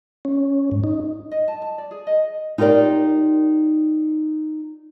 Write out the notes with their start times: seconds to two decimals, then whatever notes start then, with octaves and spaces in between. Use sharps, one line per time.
0.25 C#4
0.71 G#2
0.84 D#4
1.31 D#5
1.48 A5
1.62 A5
1.78 D5
1.91 G#4
2.07 D#5
2.58 D#4 F4 G4 A#4 D5